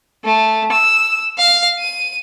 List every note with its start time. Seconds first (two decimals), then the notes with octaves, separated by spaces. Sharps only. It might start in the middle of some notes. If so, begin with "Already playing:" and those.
0.24 A3
0.72 E6
1.38 F5
1.79 D#7